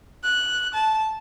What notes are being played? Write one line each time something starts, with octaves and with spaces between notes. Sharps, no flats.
F#6
A5